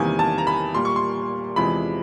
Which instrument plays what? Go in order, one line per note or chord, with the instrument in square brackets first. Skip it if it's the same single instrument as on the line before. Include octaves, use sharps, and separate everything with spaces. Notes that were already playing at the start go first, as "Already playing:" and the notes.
Already playing: [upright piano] E2 C3 D#3 G3 A#3 G#5
A5
A#5
B5
A#2 G3 A#3 C6
C#6
C6
E2 C3 F3 G#3 B5